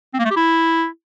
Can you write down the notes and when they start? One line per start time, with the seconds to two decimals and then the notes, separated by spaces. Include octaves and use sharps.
0.14 C4
0.19 A#3
0.25 A3
0.31 G4
0.36 E4